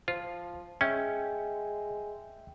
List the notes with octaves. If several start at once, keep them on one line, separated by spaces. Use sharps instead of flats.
F3 F4 C5
G#3 C#4 E5 G5 G6